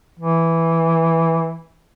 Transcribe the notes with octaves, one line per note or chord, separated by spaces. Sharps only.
E3